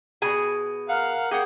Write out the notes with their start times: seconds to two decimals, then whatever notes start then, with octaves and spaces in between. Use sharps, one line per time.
0.22 B2 G#4 G#5
0.89 A#4 F5 F#5
1.31 A#3 G#4 F#5 G5